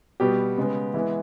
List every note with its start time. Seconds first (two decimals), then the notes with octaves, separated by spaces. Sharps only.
0.20 B2 G3 B3 G4
0.58 C#3 G#3 B3
0.94 E3 G#3 B3 E4